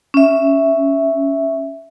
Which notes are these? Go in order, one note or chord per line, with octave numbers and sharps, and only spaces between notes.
C#4 E5